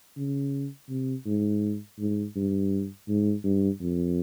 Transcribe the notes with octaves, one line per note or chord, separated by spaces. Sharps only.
C#3
C3
G#2
G#2
G2
G#2
G2
F2